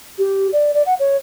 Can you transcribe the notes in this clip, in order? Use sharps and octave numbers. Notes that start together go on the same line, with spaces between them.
G4
D5
D5
F#5
C#5